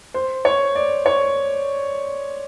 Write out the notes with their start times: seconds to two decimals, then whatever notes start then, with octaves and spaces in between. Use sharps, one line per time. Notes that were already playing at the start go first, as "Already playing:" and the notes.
0.14 C5
0.45 C#5
0.75 D5
1.06 C#5